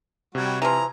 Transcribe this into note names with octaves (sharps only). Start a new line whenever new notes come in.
C3 G3 F#4 G#6
E3 F3 A#5